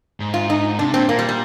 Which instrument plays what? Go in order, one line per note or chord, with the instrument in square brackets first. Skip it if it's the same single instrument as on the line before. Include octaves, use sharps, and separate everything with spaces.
[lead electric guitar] G#2
[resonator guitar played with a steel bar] F4
D#4
[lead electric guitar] C3 [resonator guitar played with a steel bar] D4
[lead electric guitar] A#2 [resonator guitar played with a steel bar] C4
[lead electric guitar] A#2 [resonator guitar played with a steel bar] A#3
[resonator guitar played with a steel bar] G3
G3